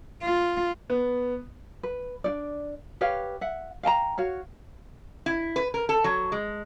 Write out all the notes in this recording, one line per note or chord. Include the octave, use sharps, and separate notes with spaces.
F4
B3
B4
D4 D#4 D5
G4 B4 C#5 F5
E5 F#5
F5 G5 A5 A#5
F#4 C#5 F5
E4
B4
A#4
A4
F#3
G#3